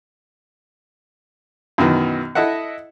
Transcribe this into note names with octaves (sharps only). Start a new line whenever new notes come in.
F#2 B2 D#3 E3
E4 A4 D#5 E5 F#5